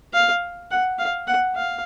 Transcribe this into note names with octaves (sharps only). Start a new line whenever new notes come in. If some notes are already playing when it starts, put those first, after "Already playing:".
F5
F#5
F5
F#5
F5